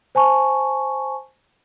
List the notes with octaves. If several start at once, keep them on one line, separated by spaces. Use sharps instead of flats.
C5 G#5 A5 C#6